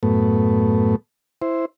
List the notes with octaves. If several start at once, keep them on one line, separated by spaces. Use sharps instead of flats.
F#2 A2 A3 B3
E4 C5